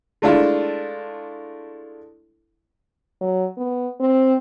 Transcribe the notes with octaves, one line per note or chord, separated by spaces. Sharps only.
G#3 A3 D4 E4 F4 A4
F#3
B3
C4